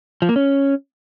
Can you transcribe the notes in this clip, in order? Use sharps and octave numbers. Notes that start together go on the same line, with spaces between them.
F3
A#3
C#4